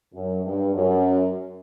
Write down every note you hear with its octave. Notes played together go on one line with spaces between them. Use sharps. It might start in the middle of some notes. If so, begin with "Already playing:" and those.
F#2
G2
F#2